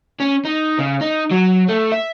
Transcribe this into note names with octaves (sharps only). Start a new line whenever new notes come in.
C#4
D#4
C#3
D#4
F#3
A3
E5